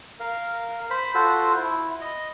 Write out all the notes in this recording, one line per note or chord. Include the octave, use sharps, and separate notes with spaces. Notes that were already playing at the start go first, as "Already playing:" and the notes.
A#4 F5
C5 B5
F4 F#4 A4 C5
E4
D#5